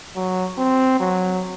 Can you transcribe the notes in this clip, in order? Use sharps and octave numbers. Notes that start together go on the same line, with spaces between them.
F#3
C4
F#3